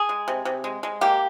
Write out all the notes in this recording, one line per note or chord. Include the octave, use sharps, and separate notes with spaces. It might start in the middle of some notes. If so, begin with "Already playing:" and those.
Already playing: G#4
G#3
C3
C3
G#3
G#3
A#3 G4